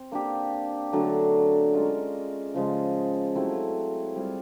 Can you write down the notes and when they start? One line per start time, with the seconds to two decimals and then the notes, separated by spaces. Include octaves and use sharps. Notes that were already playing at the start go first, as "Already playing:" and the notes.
Already playing: C4
0.12 A#3 D4 G4
0.93 D3 F#3 A3 D4
1.73 G#3 C#4 F4 A#4
2.54 C#3 F3 G#3
3.35 F#3 A3 C4 E4
4.16 G3 C4 F4 G#4